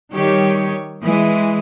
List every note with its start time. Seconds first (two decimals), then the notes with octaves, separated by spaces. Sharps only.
0.13 D#3 G3 G4 C#5
1.01 E3 G#3